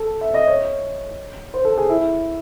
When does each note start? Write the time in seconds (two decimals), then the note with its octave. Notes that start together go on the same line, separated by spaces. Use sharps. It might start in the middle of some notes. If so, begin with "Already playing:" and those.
Already playing: A4
0.21 E5
0.34 D#5
0.48 C#5
1.54 C5
1.65 A4
1.78 G#4
1.89 E4